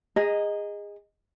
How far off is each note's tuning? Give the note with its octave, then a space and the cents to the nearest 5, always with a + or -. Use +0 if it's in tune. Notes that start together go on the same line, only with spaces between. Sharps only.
G#4 -25 D#5 +0 A#5 +0